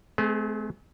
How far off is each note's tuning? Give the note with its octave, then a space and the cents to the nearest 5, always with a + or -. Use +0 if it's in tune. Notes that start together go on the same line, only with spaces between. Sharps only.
A3 -45 C4 -35 G#4 -5